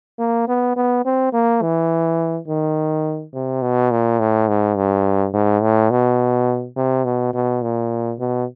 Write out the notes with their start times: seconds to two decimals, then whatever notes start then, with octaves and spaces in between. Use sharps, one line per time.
0.19 A#3
0.48 B3
0.76 B3
1.05 C4
1.33 A#3
1.62 E3
2.48 D#3
3.33 C3
3.62 B2
3.91 A#2
4.19 A2
4.48 G#2
4.76 G2
5.34 G#2
5.62 A2
5.91 B2
6.76 C3
7.04 B2
7.33 B2
7.62 A#2
8.19 B2